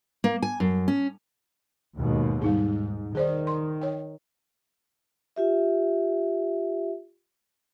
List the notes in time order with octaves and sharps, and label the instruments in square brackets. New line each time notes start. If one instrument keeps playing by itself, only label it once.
[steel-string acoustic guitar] A#3
G#5
F#2
C#4
[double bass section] D#2 G#2 B2
[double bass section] G#2 [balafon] G3 D#4 G#4
[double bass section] D#3 [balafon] G#4 C5 D5
[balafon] C6
C#5 G5
[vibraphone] F4 G4 E5